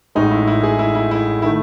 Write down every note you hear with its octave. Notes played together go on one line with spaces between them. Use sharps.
A1 A2 G#3 D#4
E4
E4
G#4
E4
E4
E4
D#3 A3 E4